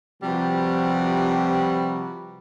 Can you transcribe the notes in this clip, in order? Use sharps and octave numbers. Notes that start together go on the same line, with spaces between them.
C3 F3 G3 F#4 B4